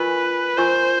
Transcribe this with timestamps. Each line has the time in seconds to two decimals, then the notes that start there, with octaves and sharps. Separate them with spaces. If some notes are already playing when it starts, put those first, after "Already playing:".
Already playing: F4 A#4 B4 D#5 G#5 C#6
0.58 F4 A#4 C5 D#5 G#5 C#6